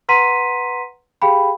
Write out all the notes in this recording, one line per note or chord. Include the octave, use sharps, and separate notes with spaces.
B4 F#5 A#5 C6 B6 D#7
G4 G#4 F5 G5 B5